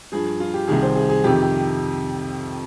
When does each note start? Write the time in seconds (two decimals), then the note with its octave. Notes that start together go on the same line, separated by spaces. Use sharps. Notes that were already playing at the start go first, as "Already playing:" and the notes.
0.12 G2 F3 G#4
0.40 F4
0.54 G4
0.68 C2 C3 D#3 G#4
0.83 C5
0.96 G#4
1.09 G#4
1.24 F2 C3 D#3 G4
1.43 G4